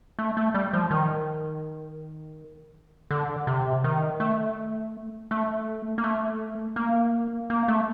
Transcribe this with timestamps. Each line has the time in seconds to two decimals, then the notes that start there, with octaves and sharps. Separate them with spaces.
0.19 A3
0.37 A3
0.54 G3
0.73 F3
0.91 D#3
3.11 D3
3.47 C3
3.84 D#3
4.20 A3
5.31 A3
5.98 A#3
6.04 A3
6.76 A#3
7.50 A#3
7.68 A3